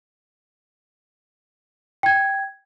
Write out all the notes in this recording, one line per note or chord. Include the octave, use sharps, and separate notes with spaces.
G5 G#6